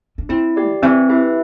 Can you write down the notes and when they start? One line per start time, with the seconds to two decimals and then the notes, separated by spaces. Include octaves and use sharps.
0.18 D4
0.29 C4 E4
0.56 G4 D5
0.72 D3
0.82 E3 C4
1.09 E4 G4 B4 E5